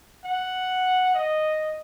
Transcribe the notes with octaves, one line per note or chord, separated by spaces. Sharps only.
F#5
D#5